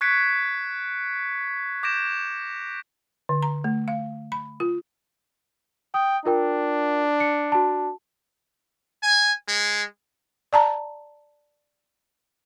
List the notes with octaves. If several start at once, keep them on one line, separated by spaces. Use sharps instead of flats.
C#6 F#6 G#6 B6 C#7 D7
D6 G6 A#6 D7 E7
D3
A#5
A3
F5
B5
F4
G5 D#6
D4 F4 A#4 G5
C#7
F#4 A5
G#5
G#3
D5 A5 A#5